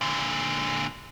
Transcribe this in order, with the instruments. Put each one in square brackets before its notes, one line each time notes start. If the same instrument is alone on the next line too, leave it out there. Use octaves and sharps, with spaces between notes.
[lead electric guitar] A#2 D3